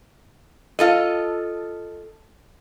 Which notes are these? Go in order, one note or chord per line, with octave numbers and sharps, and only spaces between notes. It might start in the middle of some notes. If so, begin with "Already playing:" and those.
F4 A4 D#5